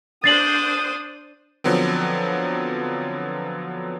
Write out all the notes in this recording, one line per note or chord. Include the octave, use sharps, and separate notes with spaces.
D4 C5 D#6 A6 C7 F#7
D3 F3 F#3 B3 C4